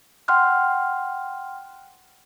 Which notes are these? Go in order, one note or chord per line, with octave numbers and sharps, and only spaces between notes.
F#5 G5 C6 F6 F#6